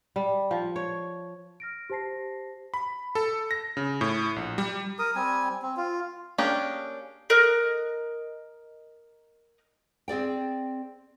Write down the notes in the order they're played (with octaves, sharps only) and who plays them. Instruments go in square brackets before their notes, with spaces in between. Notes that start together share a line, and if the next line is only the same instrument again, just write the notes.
[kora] G3
F3
C#5
[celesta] F6 A#6 D7
G4 C5 A5 A#6 C7
[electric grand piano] B5
A4
A#6
C#3
A2
A#1
G3
[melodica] A#4 D#6
G3 C4 G#5
C4
F4
[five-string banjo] A#3 C#4 D4 G4 G#4
[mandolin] A#4 D#5 F#6
[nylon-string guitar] C4 G#4 D5 G5